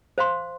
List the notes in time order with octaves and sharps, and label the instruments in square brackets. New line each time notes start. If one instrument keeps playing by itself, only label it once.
[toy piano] C5 F5 C6